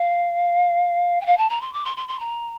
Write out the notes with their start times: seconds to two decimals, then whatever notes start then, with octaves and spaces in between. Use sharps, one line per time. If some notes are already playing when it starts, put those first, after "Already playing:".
Already playing: F5
1.20 G5
1.25 F5
1.37 A5
1.49 A#5
1.61 C6
1.73 D6
1.84 C6
1.96 C6
2.08 C6
2.19 A#5